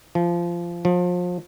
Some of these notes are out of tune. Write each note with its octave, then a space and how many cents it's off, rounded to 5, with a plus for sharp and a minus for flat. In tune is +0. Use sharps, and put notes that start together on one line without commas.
F3 -20
F3 +30